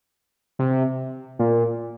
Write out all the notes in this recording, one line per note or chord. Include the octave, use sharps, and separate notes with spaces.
C3
A#2